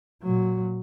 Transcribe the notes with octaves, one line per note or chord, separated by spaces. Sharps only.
A#2 F#3